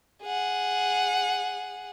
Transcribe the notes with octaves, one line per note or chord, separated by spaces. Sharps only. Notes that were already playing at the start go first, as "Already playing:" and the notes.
G#4 F#5